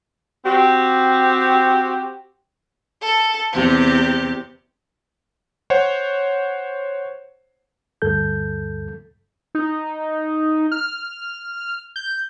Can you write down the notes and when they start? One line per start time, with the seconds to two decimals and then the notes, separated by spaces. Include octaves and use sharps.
0.45 C4 F#4 G4
3.02 A4
3.53 E2 C3 G4
5.70 C5 C#5 F#5
8.02 D2 G2 A4 G6
9.55 D#4
10.72 F6
11.96 G6